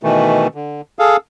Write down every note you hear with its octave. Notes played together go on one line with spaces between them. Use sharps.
B2 D#3 E3 A3
D3
G#4 A4 F5